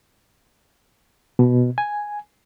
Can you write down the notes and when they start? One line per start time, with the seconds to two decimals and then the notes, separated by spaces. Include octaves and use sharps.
1.39 B2
1.78 G#5